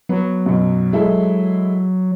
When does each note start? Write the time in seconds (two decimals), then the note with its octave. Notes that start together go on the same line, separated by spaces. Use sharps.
0.09 F#3 B3
0.46 F#2 B2
0.93 G#3 E4 A4